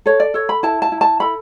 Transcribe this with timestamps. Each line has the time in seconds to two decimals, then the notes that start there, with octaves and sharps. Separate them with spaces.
0.06 A4 C#5
0.20 D5
0.34 A4 C#5
0.49 B5
0.63 E4 A5
0.82 A5
0.92 E4
1.01 A5
1.20 A4 B5